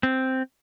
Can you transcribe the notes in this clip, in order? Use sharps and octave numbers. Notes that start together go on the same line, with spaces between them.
C4